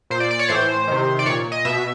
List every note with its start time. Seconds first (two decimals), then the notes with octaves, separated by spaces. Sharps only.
0.10 A#2 C5
0.20 D5
0.31 D5
0.39 C#5
0.49 A2 E3 C5
0.88 C3 D#3
1.19 D5
1.26 A#2 C#5
1.52 D#5
1.65 B2 E5